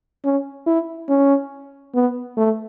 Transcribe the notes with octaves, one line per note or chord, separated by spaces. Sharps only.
C#4
E4
C#4
B3
A3